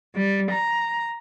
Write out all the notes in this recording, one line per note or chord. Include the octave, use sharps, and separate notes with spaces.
G3
A#5